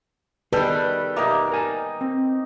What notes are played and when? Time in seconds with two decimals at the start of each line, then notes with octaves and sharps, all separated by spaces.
0.53 D#3 G3 G#4 A4 B4 G5
1.16 A#3 D#4 G4 E5 F5
1.52 A#4 G#5 A5
2.01 C4